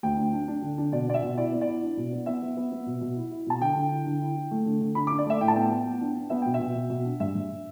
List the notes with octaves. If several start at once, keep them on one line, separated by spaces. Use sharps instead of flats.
D2 G5
D4
D4
D4
D3
D4
B2 D5
B3 D5
E5
B2
E4 D5
B3
D5
E4
D4
B2
B3
B3 E5
B3
B3
B3
B2
B2
E4
E4
B2 A5
D3 G5
D3
E4
D3
E4
E4
A3
D3
D3
D4 B5
D6
D4
D5
A3 E5
A2 G5
A5
B3 G5
B3
B3
D4
D4
B3 E5
B2 G5
E5
B2
B2
B2
D4
G2 E5
G2